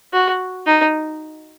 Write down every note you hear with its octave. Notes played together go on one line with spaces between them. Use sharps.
F#4
D#4